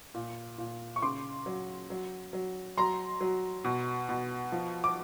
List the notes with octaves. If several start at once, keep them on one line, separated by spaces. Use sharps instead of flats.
A#2
A#2
C#6
C#3 C6 D6
F#3
F#3
F#3
F#3 A#5 C6
F#3
B2
B2
F3
D6